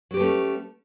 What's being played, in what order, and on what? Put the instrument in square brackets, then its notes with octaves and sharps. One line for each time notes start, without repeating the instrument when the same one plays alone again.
[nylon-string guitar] F#3
G4
B4
A3
C#4